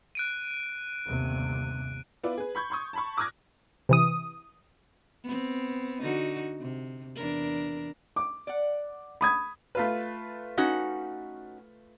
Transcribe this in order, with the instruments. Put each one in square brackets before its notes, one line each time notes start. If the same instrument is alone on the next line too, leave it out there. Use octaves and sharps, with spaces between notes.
[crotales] F#6 D7 D#7
[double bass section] G1 D#2 C3
[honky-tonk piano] B3 E4 F4 B4 D5
G#4 B4
B5 C#6 G6 G#6
C6 C#6 D#6
A5 B5 C#6
D6 D#6 F6 F#6 G#6 A#6
[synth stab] C3 E3 D#6
[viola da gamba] B3 C4
D3 D#4 F#4
C3
E2 D4 A#4
[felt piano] D6
[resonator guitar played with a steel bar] D5 F#5
[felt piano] B5 D#6 G#6
[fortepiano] A3 F4 B4
[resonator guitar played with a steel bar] C#4 D#4 F#4